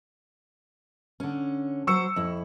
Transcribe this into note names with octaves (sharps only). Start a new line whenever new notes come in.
D3 C#4
F#3 C5 C#6 E6 C#7
F2 E4